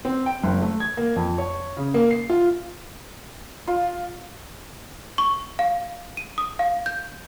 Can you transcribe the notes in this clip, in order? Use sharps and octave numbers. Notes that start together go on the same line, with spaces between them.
C4
G5
F#1
A3
G#6
A#3
F2
C#5
C#3
A#3
C7
F4
F4
C#6
F5
D#7
D#6
F5
G6